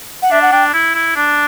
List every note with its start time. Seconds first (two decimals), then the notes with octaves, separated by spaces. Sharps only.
0.22 F#5
0.31 D4 E5
0.42 F#5
0.52 D4 G5
0.73 E4
0.95 E4
1.16 D4